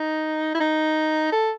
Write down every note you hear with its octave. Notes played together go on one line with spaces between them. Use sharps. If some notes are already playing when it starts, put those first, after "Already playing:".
Already playing: D#4
E4
D#4
A4